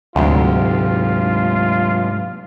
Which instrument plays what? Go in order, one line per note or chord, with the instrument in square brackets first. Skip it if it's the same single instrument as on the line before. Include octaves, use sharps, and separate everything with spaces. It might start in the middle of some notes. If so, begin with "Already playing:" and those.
[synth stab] D2 [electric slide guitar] G#2 G#3 G4 [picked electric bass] C3 F#3 [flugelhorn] F4